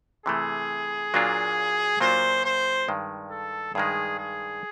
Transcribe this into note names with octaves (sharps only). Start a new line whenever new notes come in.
C3 E3 A3 G#4
A#2 F#3 A#3 D4 F4
A#2 F#3 A#3 D4 F4 C5
C5
G2 D#3 G#3
A4
G2 D#3 G#3 G#4
G#4